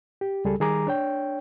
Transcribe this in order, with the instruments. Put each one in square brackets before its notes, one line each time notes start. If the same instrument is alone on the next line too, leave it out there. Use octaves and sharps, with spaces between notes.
[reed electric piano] G4
C#2 G3 G#4 A4
D#3 G3 G#4 A#5 D6
D4 C#5 G5